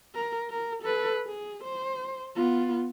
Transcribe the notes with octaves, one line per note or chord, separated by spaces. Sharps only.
A#4
A#4
A4 B4
G#4
C5
B3 F4